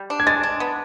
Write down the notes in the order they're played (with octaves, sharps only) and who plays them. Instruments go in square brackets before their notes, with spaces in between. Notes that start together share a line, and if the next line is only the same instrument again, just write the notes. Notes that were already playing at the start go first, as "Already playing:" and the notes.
Already playing: [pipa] G3
D4
[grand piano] G#6
[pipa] G#3 [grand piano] A6
[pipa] D4
B3